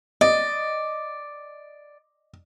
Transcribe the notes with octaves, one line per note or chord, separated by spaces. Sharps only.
D5 D#5